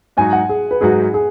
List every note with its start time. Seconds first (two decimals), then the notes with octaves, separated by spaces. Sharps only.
0.17 G#2 F#3 D#4 F#4 G#5
0.33 F#5
0.49 G#4
0.71 B4
0.81 G#2 F#3 D#4 F#4 G#4
1.14 G#4